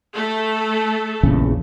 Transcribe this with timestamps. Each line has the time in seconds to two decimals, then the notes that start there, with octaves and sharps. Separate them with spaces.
0.14 A3 A4
1.23 A#1 E2 C#3